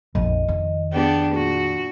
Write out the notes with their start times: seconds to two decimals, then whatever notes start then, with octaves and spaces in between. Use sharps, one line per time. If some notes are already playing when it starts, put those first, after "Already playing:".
0.15 A#1 F2 D#5
0.48 D#3
0.93 B3 D4 G4 G#4
1.34 A#2 F#4